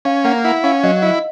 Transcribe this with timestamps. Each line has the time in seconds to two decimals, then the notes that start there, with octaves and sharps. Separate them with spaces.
0.05 C#4 F5
0.24 A#3 F#5
0.44 E4 F#5
0.64 C#4 F5
0.83 F#3 D#5
1.02 E4 D#5